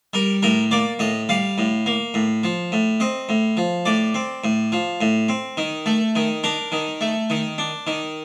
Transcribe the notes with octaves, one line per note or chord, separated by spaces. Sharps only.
G3 A#4
A2 A#4
A#3 D5
A2 D#5
G3 F5
A2
A#3
A2
F3
A2
C4 D#5
A2
F3
A2 D5
C4
A2
F3
A2
C4
D#3
A3
D#3
D4 A#4
D#3
A3
D#3
D4
D#3